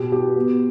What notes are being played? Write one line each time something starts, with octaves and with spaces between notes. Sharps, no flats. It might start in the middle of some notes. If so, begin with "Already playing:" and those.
Already playing: B2 G4
G4
B3